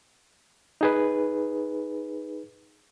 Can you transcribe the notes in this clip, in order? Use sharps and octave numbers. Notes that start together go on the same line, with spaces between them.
D#4 G#4 B4